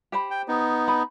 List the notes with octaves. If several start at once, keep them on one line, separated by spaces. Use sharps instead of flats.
G4 C5 B5
G5
B3 D#4
B5